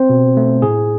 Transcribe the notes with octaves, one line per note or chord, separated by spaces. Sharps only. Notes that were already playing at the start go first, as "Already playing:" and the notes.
Already playing: C4 C5
B2
A3
A2 G#4